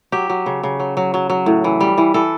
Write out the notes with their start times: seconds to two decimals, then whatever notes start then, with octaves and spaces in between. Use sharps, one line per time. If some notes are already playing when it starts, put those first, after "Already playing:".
0.12 F#3 G4
0.30 F#3
0.46 C#3
0.63 C#3
0.80 F#3
0.97 F#3
1.14 F#3
1.30 F#3
1.46 A2
1.64 E3
1.81 G3
1.98 E3
2.14 E3 A4